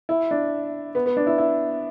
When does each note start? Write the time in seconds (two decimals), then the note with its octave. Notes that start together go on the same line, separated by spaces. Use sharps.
0.09 E4
0.31 D4
0.95 B3
1.06 B3
1.17 D4
1.27 E4
1.38 E4